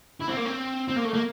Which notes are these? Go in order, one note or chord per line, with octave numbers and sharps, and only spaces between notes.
E4
C4
A#3
C4
C4
A#3
A3
A#3